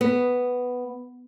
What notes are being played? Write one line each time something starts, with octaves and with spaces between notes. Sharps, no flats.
B3